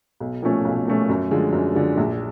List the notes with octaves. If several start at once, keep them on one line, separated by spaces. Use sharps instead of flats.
B1
A#2 F3 A3 C#4
B1
A#2 F3 A3 C#4
F#2
D3 F3 G#3
F#2
D3 F3 G#3
A#1